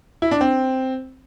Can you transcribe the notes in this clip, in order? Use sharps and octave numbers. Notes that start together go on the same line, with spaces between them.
E4
D4
C4